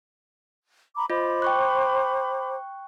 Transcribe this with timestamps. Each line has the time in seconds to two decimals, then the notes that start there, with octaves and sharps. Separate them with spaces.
0.96 A#5 B5 D6
1.10 F4 C5 D#5 B5 D6
1.42 G5 C#6 F#6